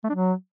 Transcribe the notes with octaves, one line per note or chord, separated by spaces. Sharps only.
A3
D4
F#3